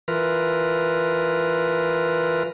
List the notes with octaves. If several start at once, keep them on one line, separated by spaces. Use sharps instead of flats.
E3 F4 A#4 B4